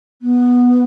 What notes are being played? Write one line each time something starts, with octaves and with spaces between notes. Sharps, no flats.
B3